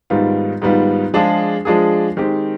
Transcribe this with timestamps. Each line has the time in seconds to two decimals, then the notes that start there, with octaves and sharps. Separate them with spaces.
0.10 G#2 D#3 G3 B3 F4
0.62 G#2 D#3 G3 B3 F4
1.14 F3 G#3 D4 F4 G#4
1.65 F3 G#3 D4 F4 G#4
2.17 D#3 G#3 C4 G4